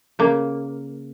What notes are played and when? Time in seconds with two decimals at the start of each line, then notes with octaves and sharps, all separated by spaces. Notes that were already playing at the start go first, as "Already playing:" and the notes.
0.19 C#3 A#3